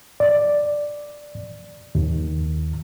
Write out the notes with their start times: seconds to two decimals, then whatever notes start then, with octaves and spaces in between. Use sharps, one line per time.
0.20 D5
1.95 D#2